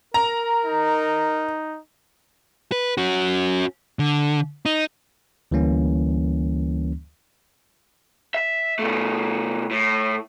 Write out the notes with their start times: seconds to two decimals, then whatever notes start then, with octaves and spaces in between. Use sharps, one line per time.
0.14 A#4 A#5
0.65 D#4
2.72 B4
2.98 C#4 F#4
3.99 D3
4.66 D#4
5.51 D2 E3 G3 A#3 C#4
8.34 E5
8.79 B2 A3
9.71 A2